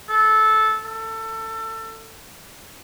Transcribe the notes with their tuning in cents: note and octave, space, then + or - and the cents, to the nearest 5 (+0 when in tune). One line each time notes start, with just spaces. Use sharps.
A4 -15
A4 +25